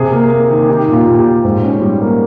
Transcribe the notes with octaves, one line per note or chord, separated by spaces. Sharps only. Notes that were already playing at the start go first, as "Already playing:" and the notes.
Already playing: C3 G#4
A#3
A#3
D#3
D#4 G4
A#2
F4
A#2
G4
A#2
G#2
C#4
G3
A#3